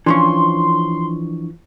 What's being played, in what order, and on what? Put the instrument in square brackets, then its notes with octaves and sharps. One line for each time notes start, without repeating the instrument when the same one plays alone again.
[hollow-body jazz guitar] E3 F3 C#4 [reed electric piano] D4 C#6 [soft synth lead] C6